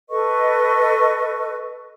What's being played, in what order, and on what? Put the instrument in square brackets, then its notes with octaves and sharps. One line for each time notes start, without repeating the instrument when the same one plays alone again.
[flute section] A4 B4 D#5 C#6